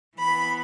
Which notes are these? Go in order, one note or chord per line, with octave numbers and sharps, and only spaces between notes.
E3 B3 B5